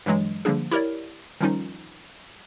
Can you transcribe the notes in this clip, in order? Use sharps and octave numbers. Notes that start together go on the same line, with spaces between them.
G2 E3 F#3 G#3
D3 F3 G3 A#3 D4 G#4
E4 G4 A#4 C#5 D5
D#3 F3 G3 C#4 D#4 F4